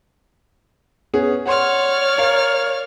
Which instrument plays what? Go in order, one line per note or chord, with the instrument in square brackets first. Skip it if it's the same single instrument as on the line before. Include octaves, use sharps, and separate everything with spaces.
[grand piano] B3 C#4 G#4
[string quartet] C#5 D5 F6 [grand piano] F#5 C6
[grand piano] A#4 F5